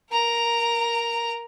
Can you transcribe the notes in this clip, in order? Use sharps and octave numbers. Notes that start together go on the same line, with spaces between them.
A#4 A#5